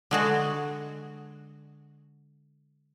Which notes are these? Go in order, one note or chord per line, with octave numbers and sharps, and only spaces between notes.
D3 G#3 F#4